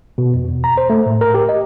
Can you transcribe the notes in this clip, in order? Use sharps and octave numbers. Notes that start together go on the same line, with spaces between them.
B2
F2
E2
A#5
C5
A3
A2
A#4
G4
D#5